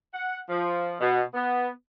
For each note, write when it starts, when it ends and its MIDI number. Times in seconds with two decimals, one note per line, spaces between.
0.14 0.39 78
0.49 0.95 53
1.00 1.22 47
1.34 1.69 59